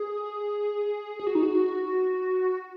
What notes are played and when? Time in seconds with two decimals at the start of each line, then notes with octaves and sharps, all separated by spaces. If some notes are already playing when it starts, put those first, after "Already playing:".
Already playing: G#4
1.20 G#4
1.27 F#4
1.35 D#4
1.43 F#4